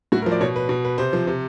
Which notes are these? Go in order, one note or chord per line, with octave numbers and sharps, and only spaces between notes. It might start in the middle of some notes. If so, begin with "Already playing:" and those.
A2 F#4
A#4
F3
D5
B2 C#5
B4
B2
B4
C3 C5
F3
C3